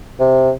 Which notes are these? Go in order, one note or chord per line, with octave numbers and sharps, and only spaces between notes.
C3